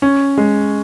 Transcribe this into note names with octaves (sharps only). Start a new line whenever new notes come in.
C#4
G#3